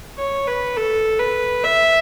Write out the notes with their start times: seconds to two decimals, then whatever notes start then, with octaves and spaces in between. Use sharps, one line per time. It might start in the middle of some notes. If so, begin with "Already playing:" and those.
0.18 C#5
0.47 B4
0.77 A4
1.19 B4
1.64 E5